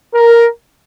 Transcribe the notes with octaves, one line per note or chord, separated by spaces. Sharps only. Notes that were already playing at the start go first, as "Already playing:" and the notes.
A#4